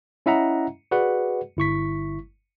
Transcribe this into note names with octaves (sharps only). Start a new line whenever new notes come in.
C#4 E4 D#5 E5 F#5 A#5
F#4 G#4 B4 D5 F#5
G1 E4 C#6 B6